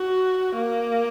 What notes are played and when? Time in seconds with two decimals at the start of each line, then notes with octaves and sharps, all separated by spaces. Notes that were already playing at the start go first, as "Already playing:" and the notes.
Already playing: F#4
0.57 A#3